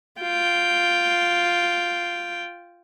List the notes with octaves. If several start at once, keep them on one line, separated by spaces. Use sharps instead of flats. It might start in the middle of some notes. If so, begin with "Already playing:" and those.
F4 G5